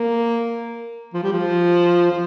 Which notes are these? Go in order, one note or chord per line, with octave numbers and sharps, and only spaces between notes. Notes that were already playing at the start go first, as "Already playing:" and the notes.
Already playing: A#3
F3
G3
F3
F3